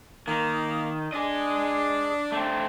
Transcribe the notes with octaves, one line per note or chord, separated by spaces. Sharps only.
D#3 A#3
D4 G#4 D#5
A3 C4